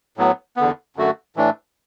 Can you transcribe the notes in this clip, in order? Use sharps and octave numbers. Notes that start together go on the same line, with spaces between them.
A2 F#3 B3
E2 D3 B3
F#2 D3 A3 F#4
A2 E3 A3 D4